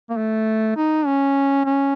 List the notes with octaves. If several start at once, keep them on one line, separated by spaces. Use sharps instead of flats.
A#3
A3
D#4
C#4
C#4